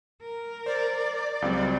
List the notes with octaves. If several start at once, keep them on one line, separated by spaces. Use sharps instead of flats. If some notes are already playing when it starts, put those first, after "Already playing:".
A#4
C5 D5
C#2 F#3 G3 C4